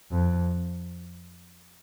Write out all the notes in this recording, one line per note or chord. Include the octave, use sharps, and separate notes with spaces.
F2